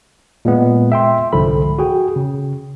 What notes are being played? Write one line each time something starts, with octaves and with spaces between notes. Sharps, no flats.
A#2 G#3 B3
E5 G5 C6
C2 G#2 D3 F3 A4 B5
F#4 G#4 G5
C#3